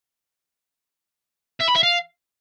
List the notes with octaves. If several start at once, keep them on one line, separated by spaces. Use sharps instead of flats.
E5
B5
E5
F5